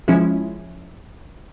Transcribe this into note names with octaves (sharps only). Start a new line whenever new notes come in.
F3 G#3 C#4 E4